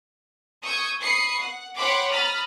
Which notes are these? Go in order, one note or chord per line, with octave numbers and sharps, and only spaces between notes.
C#6 D#6 E6 G6 G#6
B5 C#6 D#6 C7 C#7
F#5
C#5 F#5 G5 B5 C6 D6
A#5 B5 D#6 F6 A6